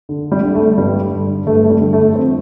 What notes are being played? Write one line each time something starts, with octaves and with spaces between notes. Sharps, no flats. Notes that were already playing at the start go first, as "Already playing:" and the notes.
D3
G3
D3
A3
G2 G3
D3
G2 A3
A3
G3
D3
A3
F2 C4